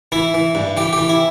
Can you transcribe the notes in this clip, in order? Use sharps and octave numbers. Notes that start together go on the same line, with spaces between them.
E3 E4
E3
G2
E3 G4
G4
E3
E4